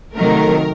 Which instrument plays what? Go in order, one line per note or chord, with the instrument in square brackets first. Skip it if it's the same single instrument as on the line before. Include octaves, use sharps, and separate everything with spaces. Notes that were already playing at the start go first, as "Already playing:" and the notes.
[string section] C3 D#3 F#3 A3 A#4